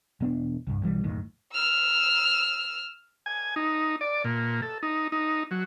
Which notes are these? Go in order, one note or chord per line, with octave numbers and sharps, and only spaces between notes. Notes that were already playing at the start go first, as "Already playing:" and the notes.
E1 B3 D4
C2 G2
B1 E3 G3
F#1 D#2 A2 D#3
E6 F6
G#5
D#4
D5
A#2
A4
D#4
D#4
F#3